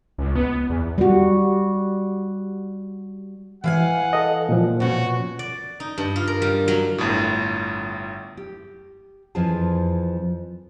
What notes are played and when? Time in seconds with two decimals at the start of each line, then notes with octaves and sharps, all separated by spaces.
0.18 C#2
0.36 B3
0.70 E2
0.98 G3 F#4
3.64 E3 F5 F#5 G#5
4.13 A4 D#5
4.49 A#2 F3
4.80 B2 C#4 F#4
5.39 D5
5.80 D#4
5.98 G2
6.16 F4
6.27 A#4
6.42 G3
6.68 F#3
6.98 G1 A2
8.37 G4
9.35 F2 E3 F3 G#4 A5